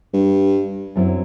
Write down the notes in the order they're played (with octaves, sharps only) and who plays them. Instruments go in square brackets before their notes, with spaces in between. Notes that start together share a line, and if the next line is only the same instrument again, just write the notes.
[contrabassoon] G2
[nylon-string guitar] F#2 F#3 C4 E4